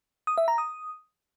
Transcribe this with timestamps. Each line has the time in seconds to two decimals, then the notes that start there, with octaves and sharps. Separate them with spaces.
0.27 D#6
0.38 E5
0.48 A#5
0.58 D#6